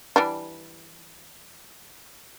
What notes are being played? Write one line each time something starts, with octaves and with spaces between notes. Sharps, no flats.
E3 G3 D4